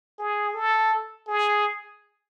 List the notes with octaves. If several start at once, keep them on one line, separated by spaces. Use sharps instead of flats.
G#4
A4
G#4